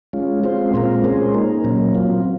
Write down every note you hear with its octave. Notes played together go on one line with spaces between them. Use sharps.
G#3 C#4 F4
G#3 C4 F4 C5
A#2 G#3 C4 F4 A#4
G#3 C#4 G#4 C5
A#3 D#4 A#4
A#2 F#3 A#3 C#4
F#3 C4 F4